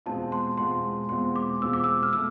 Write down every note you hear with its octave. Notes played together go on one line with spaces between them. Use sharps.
E2 B2 G#3 C4 F4 A5
C6
E2 B2 G#3 C4 F4 C6
E2 B2 G#3 C4 F4 C6
D6
E2 B2 G#3 C4 F4 E6
D6
E6
F6
B2 A3 E6